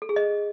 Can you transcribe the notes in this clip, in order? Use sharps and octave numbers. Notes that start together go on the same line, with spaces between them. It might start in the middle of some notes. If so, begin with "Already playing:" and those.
A4
G#4
D#5